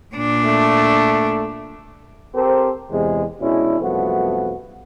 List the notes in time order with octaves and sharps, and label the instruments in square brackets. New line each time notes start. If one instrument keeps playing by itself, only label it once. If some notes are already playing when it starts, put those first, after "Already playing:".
[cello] A#2 D4
[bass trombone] A3
[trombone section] C4 G4 A4 A#4 C5
E2 C3 G#3
B2 G#3 C#4 D4 E4
C2 F#2 F3 A3 B3 F#4